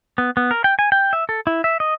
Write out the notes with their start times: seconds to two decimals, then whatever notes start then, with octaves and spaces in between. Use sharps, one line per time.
0.18 B3
0.37 B3
0.51 A#4
0.64 G5
0.79 G#5
0.92 G5
1.13 E5
1.29 A4
1.47 E4
1.64 E5
1.80 D#5